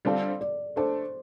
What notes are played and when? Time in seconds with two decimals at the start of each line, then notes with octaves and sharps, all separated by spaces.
0.05 D3 G3 C4 F4 A4 D5
0.41 D5
0.76 A3 D4 A4 C5